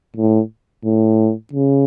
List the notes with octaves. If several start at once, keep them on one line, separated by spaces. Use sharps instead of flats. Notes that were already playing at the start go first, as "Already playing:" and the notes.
A2
A2
C#3